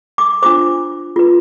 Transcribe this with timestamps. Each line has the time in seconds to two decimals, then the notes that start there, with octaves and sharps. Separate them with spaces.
0.18 D6
0.42 D4 F4 C5 D6
1.16 F4 B4